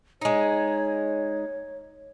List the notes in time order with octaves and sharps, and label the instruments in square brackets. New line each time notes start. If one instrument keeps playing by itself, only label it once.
[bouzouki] G#3 D#4 [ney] C#5